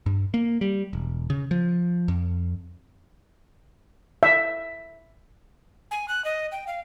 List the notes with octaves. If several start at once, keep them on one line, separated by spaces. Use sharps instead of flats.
G2
A#3
G3
E1
C#3
F3
F2
E5
G#5
F#6
D#5
G5
F5